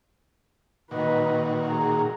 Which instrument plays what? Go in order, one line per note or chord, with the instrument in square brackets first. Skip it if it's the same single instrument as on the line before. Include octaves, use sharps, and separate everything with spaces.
[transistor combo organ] A#2 D#3 F#4 [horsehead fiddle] B4 D#5
[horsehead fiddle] G#4 A#5